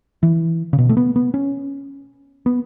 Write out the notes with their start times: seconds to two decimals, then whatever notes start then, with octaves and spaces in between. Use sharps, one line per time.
0.23 E3
0.73 C#3
0.79 B2
0.89 A3
0.97 B3
1.16 B3
1.34 C#4
2.46 B3